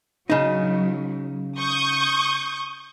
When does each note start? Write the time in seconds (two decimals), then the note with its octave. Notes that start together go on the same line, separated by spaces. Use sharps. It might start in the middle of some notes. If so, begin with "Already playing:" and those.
0.30 C#3 F#3 D#4
1.59 C#6 D#6 G6